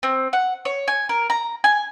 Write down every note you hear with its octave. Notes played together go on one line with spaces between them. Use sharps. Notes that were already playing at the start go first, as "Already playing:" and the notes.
C4
F#5
C#5
G#5
A#4
A#5
G#5